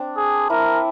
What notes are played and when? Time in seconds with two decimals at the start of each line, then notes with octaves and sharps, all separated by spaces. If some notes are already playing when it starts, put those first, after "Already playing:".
Already playing: C4 D4
0.17 G#4
0.50 E4 A#4